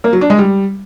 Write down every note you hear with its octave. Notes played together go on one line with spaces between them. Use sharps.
A#3
F#3
D4
G#3
G3